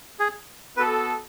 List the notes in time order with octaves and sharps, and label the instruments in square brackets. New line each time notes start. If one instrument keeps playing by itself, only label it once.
[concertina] G#4
[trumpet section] B3 F#4 A4 [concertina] B4